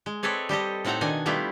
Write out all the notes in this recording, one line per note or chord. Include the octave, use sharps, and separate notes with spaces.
G#3
C4 G#4 A4 B4 C#5 D5
G3 G4 A4 D#5
A2 C4 D#4 A4 F#5 A#5
B2 D#3 D4 D#5 G#5
G3 A3 B3 E4 F4 G4